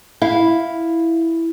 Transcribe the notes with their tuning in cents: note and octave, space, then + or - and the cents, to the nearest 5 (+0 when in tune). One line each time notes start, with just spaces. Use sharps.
E4 +0 F5 +0